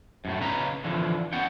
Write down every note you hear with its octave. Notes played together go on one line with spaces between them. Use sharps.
F#2 A2 A3
C#3 C#4 B4 D#5 A#5
D3 E3 F3
B3 C#4 E4 F#5 G5